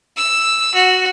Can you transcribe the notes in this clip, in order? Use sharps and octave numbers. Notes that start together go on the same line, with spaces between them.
E6
F#4